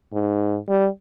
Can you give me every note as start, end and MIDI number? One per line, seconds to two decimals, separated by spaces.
0.13 0.57 44
0.69 0.87 55